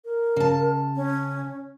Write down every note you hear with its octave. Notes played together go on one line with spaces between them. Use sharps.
A#4
C#3 A5
C#4